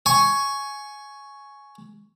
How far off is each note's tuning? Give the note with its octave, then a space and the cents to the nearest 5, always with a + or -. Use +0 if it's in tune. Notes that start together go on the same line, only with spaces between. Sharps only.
G#5 +10 C#6 +0